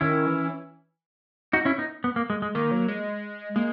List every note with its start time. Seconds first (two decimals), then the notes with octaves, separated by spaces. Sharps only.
0.01 D#3 C#4 E4
0.27 E3
1.53 D#4 F#4
1.65 C#4 E4
1.78 B3 D#4
2.04 B3
2.16 A#3
2.30 G#3
2.42 G#3
2.55 D#3 A#3
2.71 F#3
2.88 G#3
3.56 G#3 A#3